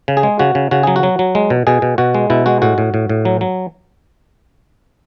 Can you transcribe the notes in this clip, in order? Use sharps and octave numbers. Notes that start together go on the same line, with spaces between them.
C#3
G#4
G#3
C#3 F#4
C#3
C#3 F#4
F#3 G#4
F#4
F#3
F#3
G#3
B2
B2 G#4
B2
B2 F#4
G#3
B2 E4
G#3 F#4
A2 F#4
A2
A2
A2
F#3
F#3